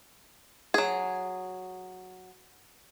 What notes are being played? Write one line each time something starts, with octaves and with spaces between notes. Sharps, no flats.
F#3 G#4